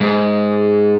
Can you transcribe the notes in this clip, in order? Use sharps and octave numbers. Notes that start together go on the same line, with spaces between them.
G#2